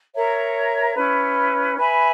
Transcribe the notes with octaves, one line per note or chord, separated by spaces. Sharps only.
A#4 C#5 E5 A#5
C#4 E4 B4
B4 E5 G#5 B5